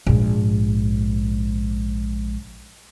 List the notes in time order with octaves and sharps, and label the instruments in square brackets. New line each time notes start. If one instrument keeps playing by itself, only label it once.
[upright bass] A#1 G#2